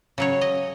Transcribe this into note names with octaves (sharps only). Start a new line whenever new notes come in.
C#3 F#3 C#5
D#5